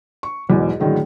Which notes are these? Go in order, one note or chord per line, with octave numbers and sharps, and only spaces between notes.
C#6
B1 E2 G#2 B2
A2 D3 D#3 F#3 G#3